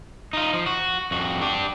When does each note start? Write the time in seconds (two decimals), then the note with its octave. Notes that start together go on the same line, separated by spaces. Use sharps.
0.33 D#4 F4
0.53 F3
0.66 F#4
1.11 F2 F#4
1.41 D4 G4